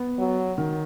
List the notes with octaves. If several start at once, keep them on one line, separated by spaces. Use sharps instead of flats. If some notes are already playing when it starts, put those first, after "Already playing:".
Already playing: B3
F#3
D#3